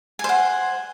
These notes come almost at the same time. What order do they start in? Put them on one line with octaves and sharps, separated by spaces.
G#5 C5 F#5